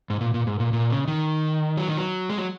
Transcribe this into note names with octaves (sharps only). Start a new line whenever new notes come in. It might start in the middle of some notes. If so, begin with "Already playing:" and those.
G#2
A#2
A#2
G#2
A#2
A#2
C#3
D#3
F#3
D#3
F#3
G#3
F#3